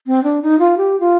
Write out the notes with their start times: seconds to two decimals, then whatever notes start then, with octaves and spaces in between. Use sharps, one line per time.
0.07 C4
0.24 D4
0.42 D#4
0.59 F4
0.77 G4
1.00 F4